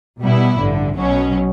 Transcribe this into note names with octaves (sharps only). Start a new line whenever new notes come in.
B2 G3 B3 E4
A1 G2 D3
B1 B2 F#3 C#4